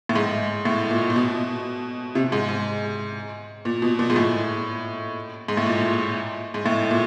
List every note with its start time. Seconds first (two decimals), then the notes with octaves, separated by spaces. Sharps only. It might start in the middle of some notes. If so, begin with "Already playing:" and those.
0.09 A2
0.16 G#2
0.65 A2
0.90 A#2
1.10 A#2
1.16 B2
2.15 C3
2.32 G#2
2.49 G#2
3.65 A#2
3.82 B2
3.99 A#2
4.10 G#2
4.16 A2
5.48 G#2
5.57 A2
5.66 A#2
6.54 G#2
6.66 A2
6.91 A#2